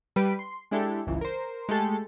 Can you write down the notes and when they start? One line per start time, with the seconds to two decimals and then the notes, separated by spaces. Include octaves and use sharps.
0.16 G3 B4 B5 D7
0.39 C6
0.71 G#3 D4 E4 G4 A4
1.07 G1 C#2 E3
1.21 A#4 C5
1.69 G#3 A3 G4 A4 A5